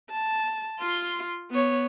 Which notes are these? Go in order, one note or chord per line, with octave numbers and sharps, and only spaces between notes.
A5
F4 C6
B3 C#5